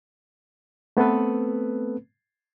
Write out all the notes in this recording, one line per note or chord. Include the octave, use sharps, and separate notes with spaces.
A3 B3 C4 A4 B4